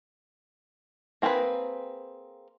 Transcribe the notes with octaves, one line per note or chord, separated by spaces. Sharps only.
A#3 C4 G#4 A#4 B4